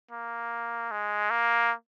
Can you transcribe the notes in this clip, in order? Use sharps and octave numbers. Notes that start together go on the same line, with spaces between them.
A#3
G#3
A#3